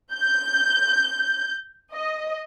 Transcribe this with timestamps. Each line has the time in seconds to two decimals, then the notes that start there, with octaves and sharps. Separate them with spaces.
0.13 G6
1.93 D#5